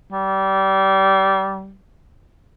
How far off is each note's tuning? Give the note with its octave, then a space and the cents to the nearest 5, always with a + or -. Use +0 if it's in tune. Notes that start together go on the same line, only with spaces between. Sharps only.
G3 -25